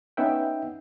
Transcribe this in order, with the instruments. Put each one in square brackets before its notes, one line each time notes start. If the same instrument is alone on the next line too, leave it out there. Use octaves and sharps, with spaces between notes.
[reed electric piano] B3 C#4 D#4 E5 F#5 G5